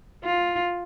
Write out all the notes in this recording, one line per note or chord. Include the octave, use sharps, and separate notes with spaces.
F4